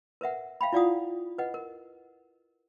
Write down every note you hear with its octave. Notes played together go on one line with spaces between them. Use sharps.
A#4 B4 E5 F#5
E5 F5 G5 B5
E4 F4 D5 F5 F#5 D#6
B4 D#5 F#5
A#4